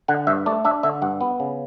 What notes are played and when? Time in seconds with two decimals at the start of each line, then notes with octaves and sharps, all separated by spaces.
0.08 D3 F#5
0.27 G2 E5
0.46 A3 D5
0.65 D4 E5
0.83 D3 E5
1.02 G2 F#5
1.21 B3
1.40 C#3